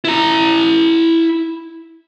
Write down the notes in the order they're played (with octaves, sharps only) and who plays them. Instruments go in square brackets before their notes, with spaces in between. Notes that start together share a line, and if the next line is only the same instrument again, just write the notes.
[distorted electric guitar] E4 A#5